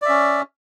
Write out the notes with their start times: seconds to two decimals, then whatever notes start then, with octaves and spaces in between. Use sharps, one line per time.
0.02 D5
0.05 E5
0.09 C#4